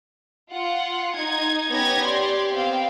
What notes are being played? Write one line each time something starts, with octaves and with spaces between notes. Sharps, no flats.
F4 F#5
D#4 G#6
B3 C#4 D#4 G4 G#6 A#6
G4 D5 C6
B3 C4 F5 G5